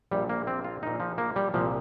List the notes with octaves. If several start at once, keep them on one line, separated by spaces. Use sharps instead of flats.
A#1 A#2 G3
A#3
C4
F4
A#1 A#2 D#4
F3
A#3
G3
C2 A#2 F3